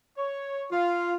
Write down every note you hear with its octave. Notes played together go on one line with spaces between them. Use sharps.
C#5
F4